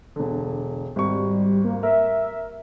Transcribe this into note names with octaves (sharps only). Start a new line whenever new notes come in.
E1 D3
G#1 G3 C#6
A#3
A#4 E5